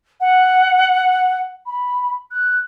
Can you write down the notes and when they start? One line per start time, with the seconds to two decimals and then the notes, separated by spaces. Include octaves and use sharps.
0.21 F#5
1.66 B5
2.31 F#6